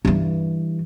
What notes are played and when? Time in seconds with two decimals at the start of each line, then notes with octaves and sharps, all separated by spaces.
0.05 G2 E3